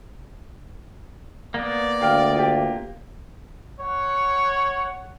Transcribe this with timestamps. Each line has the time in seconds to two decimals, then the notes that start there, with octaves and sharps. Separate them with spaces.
1.54 A#3 B3 D5
2.01 D2 F5 G5 F6
2.34 F4 G4
3.80 C#5 F#5